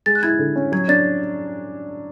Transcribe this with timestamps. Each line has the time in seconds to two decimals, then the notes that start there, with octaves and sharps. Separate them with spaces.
0.06 G#3 A6
0.15 F#6
0.23 E4 G#6
0.39 D3
0.56 C#4
0.72 F#3 G#6
0.89 D4 A6